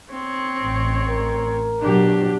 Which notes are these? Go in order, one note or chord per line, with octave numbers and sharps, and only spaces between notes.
C4 C#5
A1
A#4
B2 F#3 D4 G4